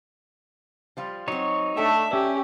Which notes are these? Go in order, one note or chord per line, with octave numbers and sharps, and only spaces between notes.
F3 G3 F4
F#3 C4 D#4 C#5
A3 D4 A4 E5 G5
C#4 G4 E5